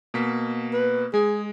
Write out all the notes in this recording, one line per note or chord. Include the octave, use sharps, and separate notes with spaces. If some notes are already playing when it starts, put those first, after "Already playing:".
B2 A#3 B6
B4
G#3 G#4